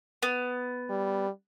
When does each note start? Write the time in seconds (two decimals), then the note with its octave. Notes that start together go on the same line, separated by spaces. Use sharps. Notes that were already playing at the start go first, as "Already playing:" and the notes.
0.23 B3
0.90 G3